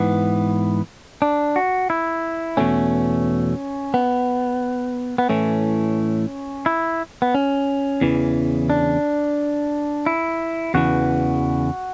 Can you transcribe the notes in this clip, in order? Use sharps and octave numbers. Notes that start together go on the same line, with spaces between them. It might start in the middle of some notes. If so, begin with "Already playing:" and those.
Already playing: G#2 E3 B3
D4
F#4
E4
E2 B2 A3 C#4
B3
B3
A2 E3 A3 C#4
E4
B3
C#4
E2 C#3 E3
D4
E4
E2 C#3 E3 F#4